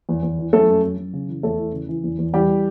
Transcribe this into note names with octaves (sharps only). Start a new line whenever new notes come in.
E2
E2
E3
F#2 A3 A4
F#2
F#2
F#2
C#3
E3
E2 A3 A4
E3
C#3
E3
E2
E2
E3 G3 G4